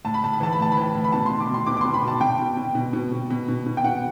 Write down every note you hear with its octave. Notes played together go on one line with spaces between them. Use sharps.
A2 A5
B5
A2 A5
B5
E3 A5
B5
A2 A5
B5
E3 A5
A2
B5
B2 A5
B2 C6
D6
B2
C6
B2 D6
D6
B2 C6
B5
B2 A5
B2 G5
B2
B2
B2
B2
B2
B2
B2
B2
G5
B2 F#5